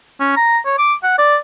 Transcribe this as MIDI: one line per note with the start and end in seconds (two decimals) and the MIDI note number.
0.20 0.33 61
0.37 0.58 82
0.66 0.78 73
0.78 0.94 86
1.04 1.15 78
1.18 1.37 74